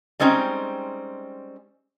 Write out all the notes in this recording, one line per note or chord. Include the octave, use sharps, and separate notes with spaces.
G3 G#3 C4 C#4 D#4